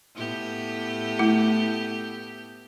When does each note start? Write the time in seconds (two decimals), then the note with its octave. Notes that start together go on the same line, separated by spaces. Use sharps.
0.15 A2 B3 G4
1.19 A3 E4